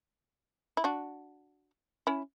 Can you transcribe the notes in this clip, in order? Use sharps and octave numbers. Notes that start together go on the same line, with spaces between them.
E4
D4 F#4
C#4 E4